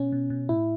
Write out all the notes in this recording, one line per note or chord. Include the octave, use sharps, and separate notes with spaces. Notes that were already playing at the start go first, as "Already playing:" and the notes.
Already playing: B2 C#4
B2
B2
A2 E4